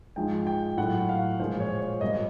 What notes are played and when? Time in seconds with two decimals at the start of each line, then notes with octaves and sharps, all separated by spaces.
0.16 G#2 F3 G#3 G5
0.47 G5
0.77 A2 F#3 F#5
1.09 F5
1.40 A#2 F3 G#3 C5
1.60 C#5
1.81 C#5
2.01 A#2 G3 D#5